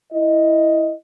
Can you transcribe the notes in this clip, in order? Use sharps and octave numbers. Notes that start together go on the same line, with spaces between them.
E4 D#5